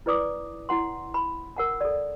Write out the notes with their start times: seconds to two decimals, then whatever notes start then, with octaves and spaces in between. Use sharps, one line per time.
0.06 E4 B4 D5 D6 D#6
0.69 E4 F#5 C6
1.14 B5
1.56 A#4 F#5 A5
1.81 A4 D5